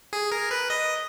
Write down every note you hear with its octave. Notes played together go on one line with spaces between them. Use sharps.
G#4
A#4
B4
D#5